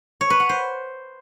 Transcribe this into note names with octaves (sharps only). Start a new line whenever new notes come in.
C#5
B4
F#5
C5